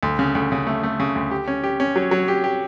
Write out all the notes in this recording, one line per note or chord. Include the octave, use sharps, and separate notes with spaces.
D2
C#3
D2
C#3
A3
A3
C#3
D2
G4
C#4
G4
C#4
F#3
F#3
G4
G4